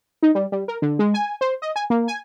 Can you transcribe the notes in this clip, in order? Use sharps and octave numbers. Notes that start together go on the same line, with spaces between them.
D#4
G3
G3
A#4
D3
G#3
G#5
C5
D#5
G#5
A#3
G#5